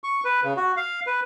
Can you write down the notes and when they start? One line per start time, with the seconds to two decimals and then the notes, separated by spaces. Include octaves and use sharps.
0.04 C#6
0.25 B4
0.44 C#3
0.57 F#4
0.77 F5
1.07 B4